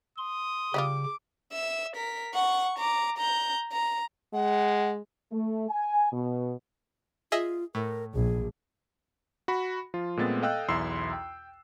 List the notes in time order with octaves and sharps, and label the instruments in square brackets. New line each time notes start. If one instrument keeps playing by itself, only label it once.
[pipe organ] C6 [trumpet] D#6
[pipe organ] C#3 [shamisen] G3 E4 F4 [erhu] D6
[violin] E5 E6
A#4 B6
F#5 C#6
A#5 D6
A#5 G6
A#5
[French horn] G#3 [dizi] F#5
[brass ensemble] A3
G#5
B2
[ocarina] F4 [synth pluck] G#4 D#5 E5
[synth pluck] A2 [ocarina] A#4
[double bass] A#1 [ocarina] G#4
[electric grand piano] F#4 B5
F3 F4
A#2 G#3 A3 B3 C4 A6
A4 D#5 F5 G5 E6 F#6
B1 E2 E4 C6 E6 C7
G5